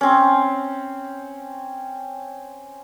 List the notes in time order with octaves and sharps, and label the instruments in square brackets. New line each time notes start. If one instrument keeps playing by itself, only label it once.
[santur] C4 C#4